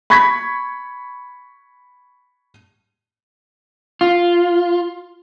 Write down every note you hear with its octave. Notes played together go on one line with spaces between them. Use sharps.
B5 C#6 G#6 B6
F4